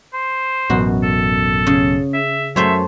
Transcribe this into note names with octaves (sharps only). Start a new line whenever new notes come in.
C5
A1 F#2 B2 F#4
A4
C#3
E5
F#2 A3 C5 C#5 E5